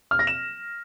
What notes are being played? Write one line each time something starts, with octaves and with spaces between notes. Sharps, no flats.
F6
A#6
E7